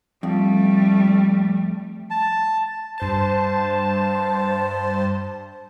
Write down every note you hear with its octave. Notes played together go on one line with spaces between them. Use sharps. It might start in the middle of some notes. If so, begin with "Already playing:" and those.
F2 G3 A3
A5
G2 C5 A5